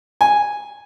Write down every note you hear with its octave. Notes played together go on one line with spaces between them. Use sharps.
G#5